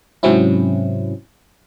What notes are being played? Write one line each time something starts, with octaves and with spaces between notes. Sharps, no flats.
G#2 C3 F#3 C4 C#4 E4